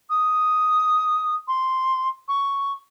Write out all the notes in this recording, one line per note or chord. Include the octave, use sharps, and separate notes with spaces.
D#6
C6
C#6